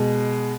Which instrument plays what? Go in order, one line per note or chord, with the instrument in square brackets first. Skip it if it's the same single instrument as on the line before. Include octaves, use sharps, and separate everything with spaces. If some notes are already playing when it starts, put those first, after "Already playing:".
Already playing: [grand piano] B2 G#3